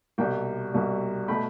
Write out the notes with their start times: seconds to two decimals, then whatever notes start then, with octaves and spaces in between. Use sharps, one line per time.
0.18 C2 B2 G3 G5
0.73 C2 B2 G3
1.28 B2 A3 G5 B5